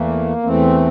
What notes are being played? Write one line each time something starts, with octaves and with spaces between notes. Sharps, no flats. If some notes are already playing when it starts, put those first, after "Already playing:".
Already playing: E2 E3 A3 A#3
E2 E3 A3 C4